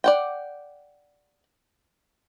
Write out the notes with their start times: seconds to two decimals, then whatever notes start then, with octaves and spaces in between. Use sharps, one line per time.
0.04 D5 F#5 G5